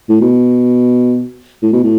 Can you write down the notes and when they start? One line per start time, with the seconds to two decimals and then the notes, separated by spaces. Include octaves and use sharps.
0.09 A2
0.21 B2
1.62 A2
1.73 B2
1.83 A2